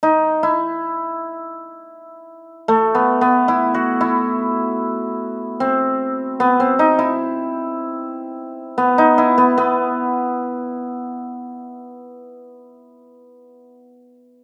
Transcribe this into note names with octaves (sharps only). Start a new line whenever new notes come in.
D#4
E4
A3
B3
B3
E4
F#4
E4
C4
B3
C4
D#4
E4
B3
D#4
E4
B3
B3